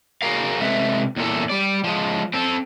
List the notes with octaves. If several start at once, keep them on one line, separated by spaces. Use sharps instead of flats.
F#4 G#4 A#4 F5
C3 G#3 A4 B4 E5
E2 A#2 A4
G3 D5
F3 G#3
C4 A4